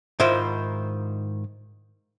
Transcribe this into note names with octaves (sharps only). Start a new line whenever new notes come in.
G#2 D#3 E4 F4 C5